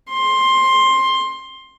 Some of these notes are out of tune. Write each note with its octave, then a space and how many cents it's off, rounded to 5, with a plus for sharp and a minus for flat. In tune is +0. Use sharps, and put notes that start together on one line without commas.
C6 +15